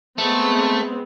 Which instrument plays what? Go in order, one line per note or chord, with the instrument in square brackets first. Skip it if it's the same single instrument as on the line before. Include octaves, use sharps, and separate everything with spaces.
[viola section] G#3 B3 C4 [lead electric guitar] A3